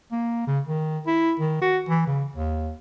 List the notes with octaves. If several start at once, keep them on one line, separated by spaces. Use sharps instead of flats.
A#3
C#3
D#3
E4
D#3
F#4
E3
C#3
D#2